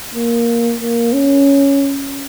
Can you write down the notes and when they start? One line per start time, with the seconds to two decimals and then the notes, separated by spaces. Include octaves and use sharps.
0.15 A#3
0.81 A#3
1.13 C#4